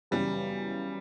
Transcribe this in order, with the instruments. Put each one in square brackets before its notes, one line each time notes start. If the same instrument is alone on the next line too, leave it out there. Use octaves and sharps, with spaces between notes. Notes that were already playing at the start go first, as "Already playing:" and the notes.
[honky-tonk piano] F#2 C#3 E3 B3 [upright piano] G3